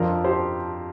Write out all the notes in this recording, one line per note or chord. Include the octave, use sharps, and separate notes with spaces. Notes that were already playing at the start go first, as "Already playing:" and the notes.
Already playing: F2 F3 D4 F4 A#4
G4 C5